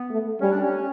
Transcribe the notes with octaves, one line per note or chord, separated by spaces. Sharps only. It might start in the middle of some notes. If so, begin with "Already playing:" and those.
Already playing: B3
A3
G3 C#4
D4
C#4